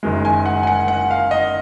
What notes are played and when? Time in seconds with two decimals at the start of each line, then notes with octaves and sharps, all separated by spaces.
0.03 F#1 F#2 D#3 G#3
0.25 G#5
0.46 F#5
0.63 G#5
0.67 F#5
0.88 F#5
1.11 F5
1.31 D#5